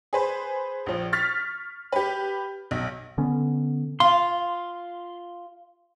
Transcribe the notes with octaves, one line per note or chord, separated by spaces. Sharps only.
G#4 B4 C5
A#1 F3
C#6 F6 A6 B6
G4 B4
B1
D3 B3 C#4
F4 C6